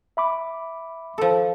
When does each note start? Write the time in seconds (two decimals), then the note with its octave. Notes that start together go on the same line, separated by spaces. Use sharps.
0.17 E5 B5 D6
1.18 F3 A4